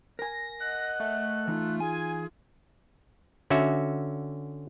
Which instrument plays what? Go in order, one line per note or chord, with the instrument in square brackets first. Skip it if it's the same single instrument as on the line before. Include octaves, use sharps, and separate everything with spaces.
[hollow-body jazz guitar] A#4 G#5 [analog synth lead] A#6
[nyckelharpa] D#5 F#5 [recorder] F#6
[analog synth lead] A3
[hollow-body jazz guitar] E3 D#4 [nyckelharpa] F4
[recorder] G#4 [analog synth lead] G#5
[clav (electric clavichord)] D3 C#4 F#4 E5